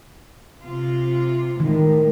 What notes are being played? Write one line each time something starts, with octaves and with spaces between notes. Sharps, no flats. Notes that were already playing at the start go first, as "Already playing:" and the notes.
C3 F4
A2 D#3 G3 G#3